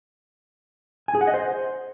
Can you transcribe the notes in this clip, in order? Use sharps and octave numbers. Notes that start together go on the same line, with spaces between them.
G#5
G#4
F#5
D#5
C5